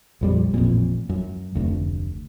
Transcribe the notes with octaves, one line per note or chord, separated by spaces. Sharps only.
A#1 F2 G3
A1 F2 A#2
F#2
F1 D2